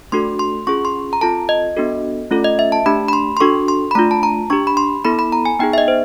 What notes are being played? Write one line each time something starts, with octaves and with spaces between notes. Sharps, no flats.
A3 D4 F#4 A4 C6
C6
C#4 F4 G#4 C#6
C6
A#5
C4 F4 A4 A5
D#5
B3 D4 F#4 A4
A3 C#4 F4 A4
D#5
E5
A5
A3 D4 G4 B5
B5
C6
C6
D4 F#4 A4 C#6
C6
B5
A3 D4 F4 A#5
A5
A#5
D4 G4 C#6
B5
C6
B3 E4 A4 B5
B5
A#5
G#5
B3 D#4 G#4 G5
E5
D#5
C5